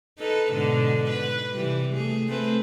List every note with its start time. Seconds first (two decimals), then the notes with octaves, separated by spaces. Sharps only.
0.19 D#4 A4 B4
0.53 G#2 B2 D3
1.10 B4
1.55 C3 E3 G3
1.94 A3 G#4
2.28 A3 C4 B4